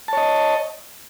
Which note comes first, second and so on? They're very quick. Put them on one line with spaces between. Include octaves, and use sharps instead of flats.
A5 C#5 D#5